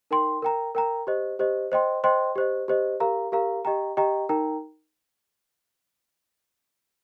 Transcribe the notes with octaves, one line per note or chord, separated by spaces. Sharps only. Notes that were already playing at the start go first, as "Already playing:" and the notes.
D#4 A#4 G5 C6
A#4 G5 A#5
A#4 G5 A#5
G4 C5 D#5
G4 C5 D#5
C5 D#5 G5 C6
C5 D#5 G5 C6
G4 C5 D#5
G4 C5 D#5
G4 A#4 F5 A#5
G4 A#4 F5 A#5
G4 D#5 G5 A#5
G4 D#5 G5 A#5
D#4 A#4 G5 A#5